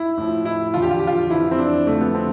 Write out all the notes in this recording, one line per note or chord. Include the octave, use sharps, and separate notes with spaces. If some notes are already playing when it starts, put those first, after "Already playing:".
Already playing: E4
A2 F3
E4
E2 D3 F3 F4
G4
F4
G4
F4
F2 E3 E4
C4
D4
F2 D3 F3 A3
B3
C4